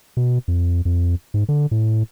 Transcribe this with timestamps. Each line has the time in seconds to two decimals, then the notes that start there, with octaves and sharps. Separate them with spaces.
0.17 B2
0.48 F2
0.85 F2
1.34 G#2
1.49 D3
1.71 A2